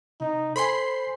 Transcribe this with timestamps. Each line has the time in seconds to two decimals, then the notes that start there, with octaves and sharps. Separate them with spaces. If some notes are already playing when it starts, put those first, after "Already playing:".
0.21 C3 D#4
0.56 A4 C5 G#5 B5 C6 C7